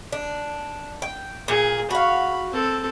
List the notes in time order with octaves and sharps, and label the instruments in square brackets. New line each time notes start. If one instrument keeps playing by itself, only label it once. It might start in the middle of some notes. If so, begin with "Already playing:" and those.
[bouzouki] D4
G5
[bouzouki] A#2 [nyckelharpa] G#4
[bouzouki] F#4 F5 [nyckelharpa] B5
[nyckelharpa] C4 A4